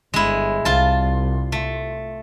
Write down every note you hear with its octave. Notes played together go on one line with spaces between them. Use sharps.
G1 G#3 E4
C2 F4 A5
A3